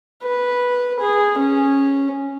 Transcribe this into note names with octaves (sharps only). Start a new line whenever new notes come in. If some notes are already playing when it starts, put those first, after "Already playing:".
B4
G#4
C#4